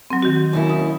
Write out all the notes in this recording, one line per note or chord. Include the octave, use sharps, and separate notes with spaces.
F#3 C4
D#3 F#4
D#2 C#4 E4
D#6